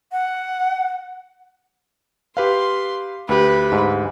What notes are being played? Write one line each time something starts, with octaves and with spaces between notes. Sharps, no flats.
F#5
G4 B4 F5 C6
D2 G4 B4
G#2